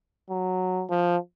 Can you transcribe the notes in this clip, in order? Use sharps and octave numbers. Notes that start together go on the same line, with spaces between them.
F#3
F3